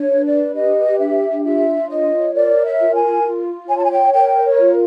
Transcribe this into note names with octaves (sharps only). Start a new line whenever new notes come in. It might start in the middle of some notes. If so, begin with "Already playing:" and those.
Already playing: D4 C#5
B4
D5
G4 D#5
D4 E5
F4 E5
C#5 D#5
A#4 D5
E5
F4
G#5
F4
C#5 G#5
A5
G#5
G5
A#4 G5
C#5
F4